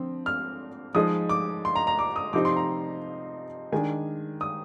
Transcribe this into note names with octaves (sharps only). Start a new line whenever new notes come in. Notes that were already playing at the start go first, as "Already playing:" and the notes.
Already playing: D3 F3 C4
F6
F3 G#3 D#4 D#6
D6
C6
A#5
A#5
D6
D#6
C3 F3 C4 D#4 D6
C6
A#5
D#3 G#3 D4 G#5
D#6